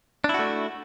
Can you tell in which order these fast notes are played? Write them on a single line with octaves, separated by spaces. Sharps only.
D4 E4 F#4 A3